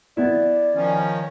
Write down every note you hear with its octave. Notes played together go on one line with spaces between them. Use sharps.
B3 E4 D5
D#3 F3 C#4